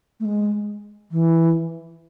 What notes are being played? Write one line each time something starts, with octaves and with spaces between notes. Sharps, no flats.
A3
G#3
E3